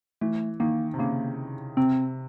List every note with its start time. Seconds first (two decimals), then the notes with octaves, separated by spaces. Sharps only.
0.21 E3 A3
0.60 D#3 A#3
0.94 C3
0.99 C#3 A#3
1.77 C3 C4